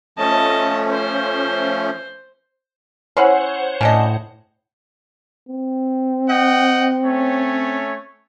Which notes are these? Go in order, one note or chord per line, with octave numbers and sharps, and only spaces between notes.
F3 A3 C#4 D#5 A5
C5
C#4 E4 C5 C#5 F#5
A2 C#4 D4 D#5
C4
D#5 F#5 G5
A3 C#4 C#5